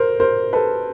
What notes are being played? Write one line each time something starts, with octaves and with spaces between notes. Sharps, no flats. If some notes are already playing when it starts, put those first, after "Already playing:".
Already playing: A#4 C5
A#4 C5
A4 B4